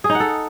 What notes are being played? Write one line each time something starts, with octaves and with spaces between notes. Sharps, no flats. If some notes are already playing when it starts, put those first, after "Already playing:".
G#4
D#4
F#5
A4